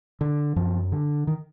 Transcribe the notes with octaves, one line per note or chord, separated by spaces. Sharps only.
D3
F#2 F3
D3
D#3